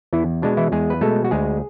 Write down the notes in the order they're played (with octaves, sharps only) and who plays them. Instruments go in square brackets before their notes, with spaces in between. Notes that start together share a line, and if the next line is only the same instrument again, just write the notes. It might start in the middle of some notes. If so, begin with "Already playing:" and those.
[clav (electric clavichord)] E2 E3 E4
B2 G#3 D4
E3 E4
E2 G#3 G#4
B4
B2 G#3 A3 A4
F#4
D2 G#3 G#4